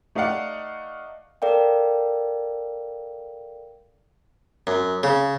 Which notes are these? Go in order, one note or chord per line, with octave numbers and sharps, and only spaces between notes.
A3 D#4 D5 F5 F#5
A4 A#4 D5 F5 G5
F#2
C#3